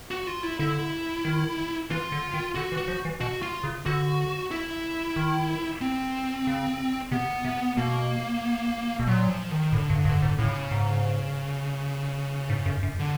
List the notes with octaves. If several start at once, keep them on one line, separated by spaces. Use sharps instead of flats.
F#4
F4
E4
D3 E4
D#3
E3 F4
D3
D#3
D3 F#4
E3
F#4
F3
E3
B2 F#4
F4
C#3
D3 F#4
E4
D#3
C4
C#3
C3 B3
C3
B2 A#3
B2
A#2 F#3
F3
D#3
A2 D3
G2
G2
G#2
A2 C#3
G#2
G#2
F#2
F#2
D3